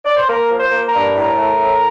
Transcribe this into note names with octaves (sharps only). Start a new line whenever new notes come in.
D5
C5
A#3 A#4
F3
C5
A#3
A#4
G2
A2 A#4
A3
A2